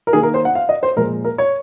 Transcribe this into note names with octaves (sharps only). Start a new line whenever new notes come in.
A#4
D#3 A#3 G#4
A#4
C5
F#5
F5
D#5
C5
A#2 F3 G#3 A#4
A#4
C#5